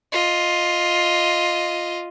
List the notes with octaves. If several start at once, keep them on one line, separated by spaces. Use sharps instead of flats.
F4 D#5